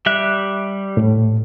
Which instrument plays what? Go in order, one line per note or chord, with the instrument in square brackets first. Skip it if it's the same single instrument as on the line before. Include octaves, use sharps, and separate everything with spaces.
[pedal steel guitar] G3 E5 F#6
[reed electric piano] A2